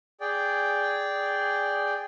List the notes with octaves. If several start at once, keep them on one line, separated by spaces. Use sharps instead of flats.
G#4 D5 G5